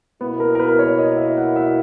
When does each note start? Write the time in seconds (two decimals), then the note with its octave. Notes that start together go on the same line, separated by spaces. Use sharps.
0.21 B2 A#3 B3 E4
0.40 A#4
0.55 A#4
0.59 B4
0.79 C#5
0.98 D#5
1.17 E5
1.37 F#5
1.56 E5